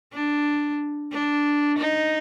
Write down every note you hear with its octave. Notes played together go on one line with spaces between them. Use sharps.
D4
D4
D#4